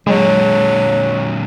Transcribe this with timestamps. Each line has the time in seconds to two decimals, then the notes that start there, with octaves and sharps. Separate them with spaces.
0.07 A#2 D3 F#3 G#3